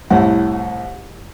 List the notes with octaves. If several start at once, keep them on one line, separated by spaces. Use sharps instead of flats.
C2 A2 F#5